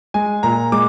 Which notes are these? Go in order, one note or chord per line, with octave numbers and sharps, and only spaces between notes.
G#3 G#5
A#2 A#5
G#3 D6